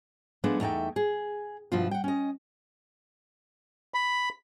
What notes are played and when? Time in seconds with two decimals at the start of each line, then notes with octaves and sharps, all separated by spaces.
0.44 F3 G#3 A3 B3 D4
0.60 E2 A3 D#4 D5 E5 G5
0.96 G#4
1.72 G2 B2 F3 E4 F4
1.91 F#5 G5
2.04 C#4 D#5
3.94 B5